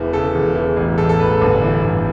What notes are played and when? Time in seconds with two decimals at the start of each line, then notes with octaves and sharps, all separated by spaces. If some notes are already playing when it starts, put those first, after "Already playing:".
Already playing: E1 E3
0.13 C#3 A4
0.35 E1
0.55 E3
0.77 A1
0.98 A1 A4
1.09 A4
1.19 A1 B4
1.30 A4
1.41 G1
1.62 E3
1.84 G1